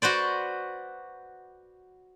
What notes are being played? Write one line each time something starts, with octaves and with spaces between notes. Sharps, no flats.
F#4 B4 C5 D5